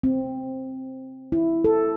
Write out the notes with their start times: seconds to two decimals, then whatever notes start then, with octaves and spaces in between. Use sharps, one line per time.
0.03 C4
1.32 E4
1.64 A4